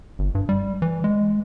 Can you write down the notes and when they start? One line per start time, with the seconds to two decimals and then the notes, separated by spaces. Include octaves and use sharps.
0.19 G1
0.35 G2
0.49 G3
0.82 E3
1.04 G#3